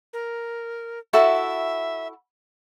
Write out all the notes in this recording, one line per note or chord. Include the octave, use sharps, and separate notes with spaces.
A#4
E4 F#4 A4 E5